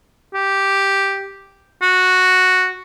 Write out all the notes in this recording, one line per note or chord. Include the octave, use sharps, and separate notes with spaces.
G4
F#4